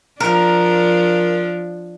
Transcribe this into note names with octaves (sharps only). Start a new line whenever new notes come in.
F3 D4 A#4